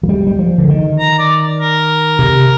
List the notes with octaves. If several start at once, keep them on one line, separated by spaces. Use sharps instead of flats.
F3
G3
G3
F3
D3
D#3
A#5
D5
A#4
C3